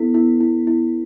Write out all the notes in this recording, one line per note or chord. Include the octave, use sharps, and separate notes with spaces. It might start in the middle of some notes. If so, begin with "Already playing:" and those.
Already playing: B3 E4 A4
E4
E4
E4